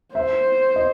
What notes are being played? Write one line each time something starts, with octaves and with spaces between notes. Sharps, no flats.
C5 E5
D#5